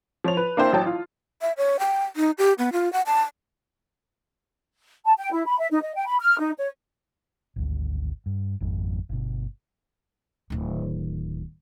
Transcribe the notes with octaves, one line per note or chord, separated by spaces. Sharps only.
F3 C#5 F7
B4
A#3 D4 E4 C5 G5
A1 F#3 G5 A5
F4
E5
C#5
G5
D#4
G4
B3
F4
F#5
A5
A5
G5
E4
B5
E5
D#4
D#5
G5
B5
F6
D#4
C#5
G#1 D2
G2
G#1 F2 G#2
G1 B2
D1 D#3